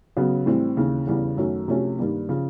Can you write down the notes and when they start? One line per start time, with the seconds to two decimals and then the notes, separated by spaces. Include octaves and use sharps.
0.17 C#3 F#3 B3
0.46 A2 E3 G3 C4
0.77 D#2 C#3 E3
1.07 E2 C#3 E3 G3 B3
1.37 F#2 D#3 F#3 A3 C#4
1.68 C3 F3 A3 C#4 F#4
1.98 G2 D#3 G3 A#3
2.28 C#3 F3